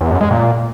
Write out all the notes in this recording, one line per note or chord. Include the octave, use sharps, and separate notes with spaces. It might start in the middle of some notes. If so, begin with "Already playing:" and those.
E2
F#2
G#3
A#2